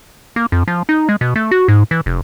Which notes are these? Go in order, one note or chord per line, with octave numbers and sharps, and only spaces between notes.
A#3
F2
F3
D#4
G#3
B2
A3
F#4
G#2
E3
F1